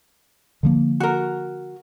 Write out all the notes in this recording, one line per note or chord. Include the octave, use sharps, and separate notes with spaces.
D3 F3 A#3
F#4 A#4